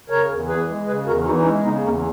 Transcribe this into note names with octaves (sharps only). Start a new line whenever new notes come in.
C#3 A#4 C#5
E2
E3 G#4 B4
G#3
C#3 G#4 B4
E2 F#4 A#4
E3 D#4 F#4
D#4
G#3 C#4 E4
C#3 B3 D#4
E2 A#3 C#4